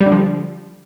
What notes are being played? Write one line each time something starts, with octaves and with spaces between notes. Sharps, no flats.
G3
D3
F3